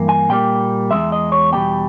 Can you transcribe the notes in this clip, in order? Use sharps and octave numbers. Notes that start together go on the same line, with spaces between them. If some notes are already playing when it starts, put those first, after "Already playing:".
Already playing: G2 E3 A#3
G#5
A#2 G3 A#3 G5
E2 D#3 G#3 E5
D#5
C#5
E2 B2 G3 A#3 G5